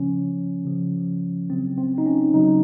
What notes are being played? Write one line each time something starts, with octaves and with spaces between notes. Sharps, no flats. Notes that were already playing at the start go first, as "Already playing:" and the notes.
Already playing: C#3 F3 C#4
C#3 F3
C#3 F#3 C4
C4
D#4
C#4
C#3 F#3 D#4